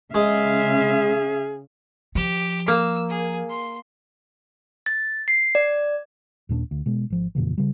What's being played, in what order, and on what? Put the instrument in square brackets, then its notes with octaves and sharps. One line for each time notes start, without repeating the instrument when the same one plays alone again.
[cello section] C#3 [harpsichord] G#3 [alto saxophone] G#4 [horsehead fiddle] E5 F5
[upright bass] F3 [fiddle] G4
[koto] A#3 [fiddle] E6
[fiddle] G#4
C6
[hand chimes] A6
C7
D5
[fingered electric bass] D#2 A#2 G3 D4
D2
B2 G#3
G#1 F3
F2 A#2 C#3 E3
C#3 G3